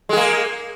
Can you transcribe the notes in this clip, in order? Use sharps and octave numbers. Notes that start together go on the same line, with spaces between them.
G#3 A#3 G#4